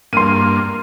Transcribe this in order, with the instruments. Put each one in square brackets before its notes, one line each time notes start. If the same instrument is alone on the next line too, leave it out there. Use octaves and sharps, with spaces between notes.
[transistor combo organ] G2 A#3 [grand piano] C6 D#7